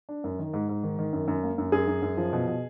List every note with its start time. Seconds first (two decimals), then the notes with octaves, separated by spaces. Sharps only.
0.09 D4
0.24 F#2
0.39 D#3
0.54 G#2
0.69 G#2
0.83 D#3
0.99 D#3
1.13 F#2
1.28 F#2
1.43 A#3
1.58 F#2
1.72 F#2 G#4
1.88 F#2
2.03 F#2
2.17 F3
2.33 B2
2.48 B2